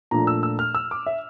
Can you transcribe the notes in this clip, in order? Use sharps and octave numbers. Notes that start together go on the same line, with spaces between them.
A#2 F3 A3 D4 A#5
E6
E6
F6
E6
D6
E5